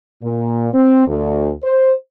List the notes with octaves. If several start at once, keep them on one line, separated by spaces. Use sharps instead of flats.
A#2
C4
D2
C5